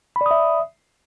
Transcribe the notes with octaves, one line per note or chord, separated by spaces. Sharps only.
D5 E5 B5 D#6